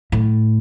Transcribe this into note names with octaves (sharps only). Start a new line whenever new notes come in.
A2